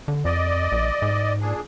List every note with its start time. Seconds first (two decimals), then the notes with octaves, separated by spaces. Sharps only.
0.08 D3
0.25 F2 D5 D#5
0.72 A#1
1.02 G#2
1.41 A#2 D4 G#4